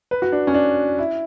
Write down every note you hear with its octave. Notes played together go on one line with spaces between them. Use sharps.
B4
F#4
D4
C#4
D4
E4